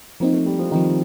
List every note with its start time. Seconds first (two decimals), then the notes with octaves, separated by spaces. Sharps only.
0.20 F3 A#3 C4 D#4
0.33 A3
0.46 G3
0.59 F3
0.71 D#3 F3 C4 D#4